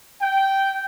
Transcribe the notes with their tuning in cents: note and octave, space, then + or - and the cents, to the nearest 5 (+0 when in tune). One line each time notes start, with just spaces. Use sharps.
G5 -10